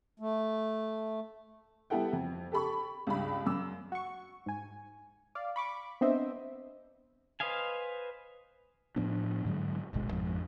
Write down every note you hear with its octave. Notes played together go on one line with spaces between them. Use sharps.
A3
G3 B3 E4 A4 F#5 G5
F2
G4 A4 B5 C#6
C#2 G2 B5
F#2 E6
F#4 C#6
G#2 G#5
D5 F5
B5 C#6 D6
B3 C4 D4 C5 D#5 E5
B4 C5 D#5 F5 G#5
A2 F3 B3 D4
G#2 D3 F#3 G#3
D1 G#1 B2 G#3
G#1 F2 F3 G#3